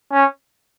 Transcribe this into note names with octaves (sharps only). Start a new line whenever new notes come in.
C#4